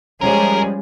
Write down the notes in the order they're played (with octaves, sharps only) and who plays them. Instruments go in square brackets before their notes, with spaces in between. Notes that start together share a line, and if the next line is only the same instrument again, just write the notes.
[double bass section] F3 G3 G#3 [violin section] C#4 G#4 [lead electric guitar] A#4